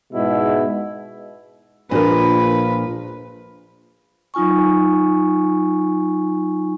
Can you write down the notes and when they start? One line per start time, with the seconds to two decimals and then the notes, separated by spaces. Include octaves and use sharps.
0.13 G#2 B2 G#3 E4
1.91 A#1 A#2 F3 D4 F4 A#4 B4
4.34 F#3 D#4 F4 G#5 C#6